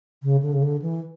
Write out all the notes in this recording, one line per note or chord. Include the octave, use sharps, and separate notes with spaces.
C#3
D3
C#3
D3
E3